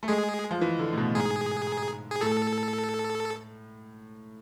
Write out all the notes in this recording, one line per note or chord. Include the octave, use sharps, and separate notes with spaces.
A3
G#3 G#4
F3
E3
D3
A2
B2
G#2 G#4
G#4
A2 A4